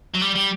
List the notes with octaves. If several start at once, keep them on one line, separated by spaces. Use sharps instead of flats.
F#3
G3
G3